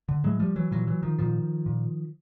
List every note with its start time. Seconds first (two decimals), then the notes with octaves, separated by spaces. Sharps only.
0.09 D3
0.24 A2 F#3 G#3
0.40 F3 G3
0.56 E3 F#3
0.71 A#2 E3 F#3
0.87 E3 F#3
1.03 D#3 F3
1.19 A#2 D#3 F3
1.66 A#2